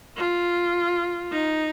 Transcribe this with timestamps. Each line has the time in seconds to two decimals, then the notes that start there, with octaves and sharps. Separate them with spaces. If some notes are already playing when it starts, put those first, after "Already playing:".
0.17 F4
1.32 D#4